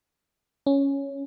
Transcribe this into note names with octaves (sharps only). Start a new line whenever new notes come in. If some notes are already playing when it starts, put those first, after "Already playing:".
C#4